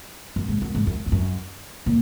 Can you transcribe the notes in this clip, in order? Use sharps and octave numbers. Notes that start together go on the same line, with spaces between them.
F#2
G#2
F#2
G#2
F#2
F2
F#2
A#2